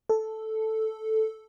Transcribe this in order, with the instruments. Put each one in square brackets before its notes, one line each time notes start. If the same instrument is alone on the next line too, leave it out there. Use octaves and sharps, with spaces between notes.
[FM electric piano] A4